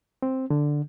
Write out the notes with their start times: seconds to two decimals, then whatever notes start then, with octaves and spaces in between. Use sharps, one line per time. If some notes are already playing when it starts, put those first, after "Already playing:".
0.22 C4
0.50 D3